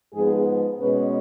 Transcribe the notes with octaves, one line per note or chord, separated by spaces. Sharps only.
G#2 F3 B3 G#4
B2 G#3 C#4 B4